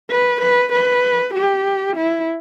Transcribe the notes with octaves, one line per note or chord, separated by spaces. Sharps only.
B4
B4
B4
G4
E4